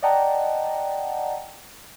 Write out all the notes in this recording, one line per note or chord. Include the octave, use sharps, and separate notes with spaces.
D5 D#5 F#5 G5 A5 A#5